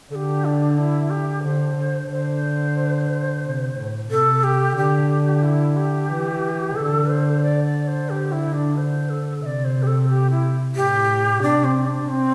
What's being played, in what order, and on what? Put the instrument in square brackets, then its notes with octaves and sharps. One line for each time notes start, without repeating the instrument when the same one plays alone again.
[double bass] D3 [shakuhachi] G4 A4
[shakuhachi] D4
E4
G4
[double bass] D3 [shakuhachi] C5
[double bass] D3
[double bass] D3 [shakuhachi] C5
[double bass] C3
A2
[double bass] C3 [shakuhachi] A4
[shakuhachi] G4
[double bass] D3 [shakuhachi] G4
[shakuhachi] E4
G4
[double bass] E3
[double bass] D3 [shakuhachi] A4
[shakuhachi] C5
D5
D5
C5
[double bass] D3 [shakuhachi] G4
[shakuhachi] E4
D4
C5
A4
[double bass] C3 [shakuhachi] E5
[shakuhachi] D5
C5
G4
A4
G4
E4
[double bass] A2 [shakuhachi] G4
[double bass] C3 [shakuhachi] D4
[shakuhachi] C4
D4
C4